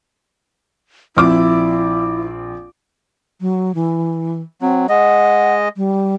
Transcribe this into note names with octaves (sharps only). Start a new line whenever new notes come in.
A#1 C4 E4 D6
F#3
E3
F#3 C4
G#3 D#5 F#5
G3